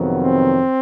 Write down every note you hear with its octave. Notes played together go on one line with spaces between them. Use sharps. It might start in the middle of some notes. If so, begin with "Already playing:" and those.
Already playing: F2 C3 D#3 F#3 B3
C4